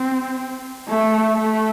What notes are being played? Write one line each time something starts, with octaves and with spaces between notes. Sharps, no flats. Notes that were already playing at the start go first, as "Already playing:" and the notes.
Already playing: C4
A3
A3